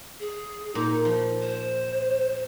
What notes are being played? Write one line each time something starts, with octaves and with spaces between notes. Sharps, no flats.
G#4
A#2 D#4
F3
C5